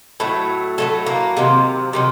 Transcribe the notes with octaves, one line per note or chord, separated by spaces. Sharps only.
A2 F#3 A3
A2 F#3 A3 A4
A#3
C3 D#3 F#3
C3 D#3 F#3